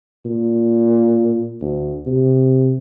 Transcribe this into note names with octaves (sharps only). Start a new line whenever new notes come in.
A#2
D2
C3